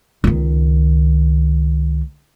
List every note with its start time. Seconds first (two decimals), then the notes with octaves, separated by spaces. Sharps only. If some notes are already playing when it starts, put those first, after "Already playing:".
0.24 C#2 D#3